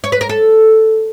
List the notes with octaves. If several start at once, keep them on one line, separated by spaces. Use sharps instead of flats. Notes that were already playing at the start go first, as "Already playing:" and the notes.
C#5
B4
A#4
A4